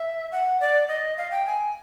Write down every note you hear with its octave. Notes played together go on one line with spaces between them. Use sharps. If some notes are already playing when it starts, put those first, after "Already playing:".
Already playing: E5
F#5
D5
D#5
F5
G5
G#5